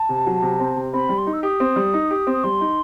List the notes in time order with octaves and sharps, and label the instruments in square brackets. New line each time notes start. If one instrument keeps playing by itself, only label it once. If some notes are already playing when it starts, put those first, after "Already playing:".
Already playing: [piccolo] A5
[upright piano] C3
F#3
C3
C4
C3
[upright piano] C4 [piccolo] B5
[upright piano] G3
[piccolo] C6
[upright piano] D#4
[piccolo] E6
[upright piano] G4 [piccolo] D#6
[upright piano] C4
G3
D#4
G4
C4
[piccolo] D#6
[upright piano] G3 [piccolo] C6
[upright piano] D#4